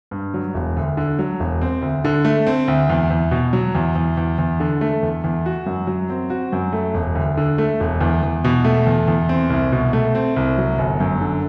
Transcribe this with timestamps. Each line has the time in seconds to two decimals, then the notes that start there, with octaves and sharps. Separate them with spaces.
0.11 G2
0.34 F#3
0.54 E1
0.77 D2
0.97 D3
1.19 F#3
1.40 E1
1.61 C4
1.82 D2
2.05 D3
2.25 A3
2.47 C4
2.68 D2
2.90 E2
3.10 E2
3.31 B2
3.53 F#3
3.75 E2
3.95 E2
4.17 E2
4.38 E2
4.60 D3
4.81 A3
5.03 E2
5.24 E2
5.46 F#4
5.66 F#2
5.87 F#3
6.10 C4
6.30 F#4
6.52 F#2
6.73 A3
6.94 E1
7.15 D2
7.37 D3
7.58 A3
7.80 E1
8.01 E2
8.23 E2
8.44 B2
8.65 A3
8.86 E2
9.08 E2
9.29 C4
9.50 C2
9.72 B2
9.93 A3
10.15 C4
10.36 C2
10.58 F#3
10.78 G1
11.00 F#2
11.21 D3